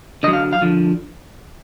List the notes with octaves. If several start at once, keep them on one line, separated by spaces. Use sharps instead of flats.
D3 F#3 D#5
F5
F5
D3 F3